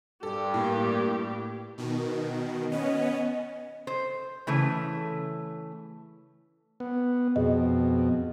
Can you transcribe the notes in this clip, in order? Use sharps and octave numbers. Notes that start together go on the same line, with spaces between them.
G2 G4 A4
A2 A#3
B2 D#3
B3 C#4 D#5
C5
C#3 E3 A3
B3
F2 B2 G#4 D#5